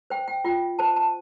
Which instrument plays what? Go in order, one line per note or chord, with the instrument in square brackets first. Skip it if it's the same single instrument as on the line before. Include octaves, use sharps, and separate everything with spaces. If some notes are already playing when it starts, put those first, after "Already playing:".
[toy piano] C5 G5
G5
F4 G5
C5 A5
A5